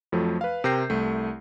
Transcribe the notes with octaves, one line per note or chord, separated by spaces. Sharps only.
F2 F3 F#3 A3
B4 F5
C3 A#4 G5 G6 A#6 C7
C2 A3